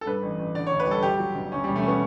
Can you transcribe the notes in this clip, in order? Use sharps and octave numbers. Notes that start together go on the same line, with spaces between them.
A4
G2 B4
A1
A1
D3 D5
C#5
D2
B4
G3 A4
G1 G4
F#3
G1
D2 C#4
G3
E1
A3
C#4
B3